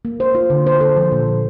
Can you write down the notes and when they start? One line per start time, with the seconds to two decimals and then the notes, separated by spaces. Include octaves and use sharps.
0.05 A#3
0.20 C5
0.35 F4
0.50 D3
0.66 C5
0.81 A4
0.97 F3
1.12 A#2
1.28 F3